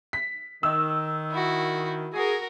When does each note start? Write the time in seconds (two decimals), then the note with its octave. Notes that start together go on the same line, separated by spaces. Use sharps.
0.13 B6
0.63 D#3 E6
1.31 E4 F#4
2.13 F#4 G#4 A#4